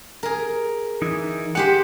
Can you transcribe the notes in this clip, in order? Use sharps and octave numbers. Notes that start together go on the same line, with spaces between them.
G#4 A#4
E3 D#4 E4
G#3 G4 C5 F#5